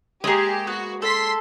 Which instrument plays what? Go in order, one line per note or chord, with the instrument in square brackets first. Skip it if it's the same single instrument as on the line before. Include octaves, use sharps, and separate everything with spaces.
[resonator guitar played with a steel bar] G#3 A#3 [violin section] G4 [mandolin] G#4 D#5
[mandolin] B3 [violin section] F#4
[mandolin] A4 [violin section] C6 B6